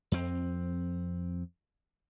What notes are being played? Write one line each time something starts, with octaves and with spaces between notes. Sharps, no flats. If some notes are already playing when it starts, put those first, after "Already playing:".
F2 C4